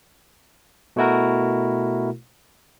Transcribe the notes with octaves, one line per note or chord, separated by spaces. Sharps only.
B2 A3 E4 F#4 A#4